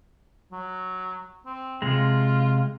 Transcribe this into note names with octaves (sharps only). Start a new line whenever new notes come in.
F#3
C4
C3 G#3 F4